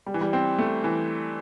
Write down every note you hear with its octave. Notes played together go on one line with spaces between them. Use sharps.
G3
E3
G3
C4
A3
E3